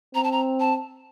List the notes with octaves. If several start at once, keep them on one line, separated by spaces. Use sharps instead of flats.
C4 A#5
A5
A#5
A5